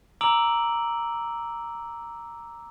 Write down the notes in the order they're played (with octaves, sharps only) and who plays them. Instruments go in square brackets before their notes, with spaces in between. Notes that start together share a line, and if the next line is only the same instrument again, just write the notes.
[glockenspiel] A#5 D6 E6 D7 F#7